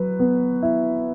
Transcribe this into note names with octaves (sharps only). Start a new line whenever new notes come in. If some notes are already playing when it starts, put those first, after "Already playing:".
Already playing: F#3 B4
B3
E4